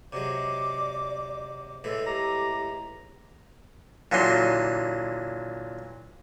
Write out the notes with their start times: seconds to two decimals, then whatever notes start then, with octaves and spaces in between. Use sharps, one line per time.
0.13 C3 F#3 G#3 D5 D6
1.84 A2 E3 G#3 A4
2.06 G4 A#5 D6
4.12 A#2 D3 E3 F#3 C6